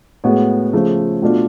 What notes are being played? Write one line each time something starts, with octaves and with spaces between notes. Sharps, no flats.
A2 G#3 B3 F#4
C#3 F3 A3
B2 A3 D4 F4